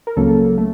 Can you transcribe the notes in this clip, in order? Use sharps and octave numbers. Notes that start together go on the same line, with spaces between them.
A#4
C#2 C#3 F#3 A#3 A4
A3